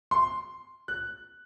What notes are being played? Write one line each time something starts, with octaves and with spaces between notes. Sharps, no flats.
C6
F#6